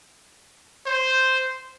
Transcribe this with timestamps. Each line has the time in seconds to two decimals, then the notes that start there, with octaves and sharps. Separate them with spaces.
0.86 C5